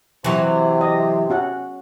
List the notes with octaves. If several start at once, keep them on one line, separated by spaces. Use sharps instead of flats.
C3 E3 F#3
D#5
C#4 F#4 F#5